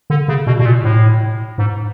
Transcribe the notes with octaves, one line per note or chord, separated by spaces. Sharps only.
D3
C#3
B2
B2
A#2
A2
G#2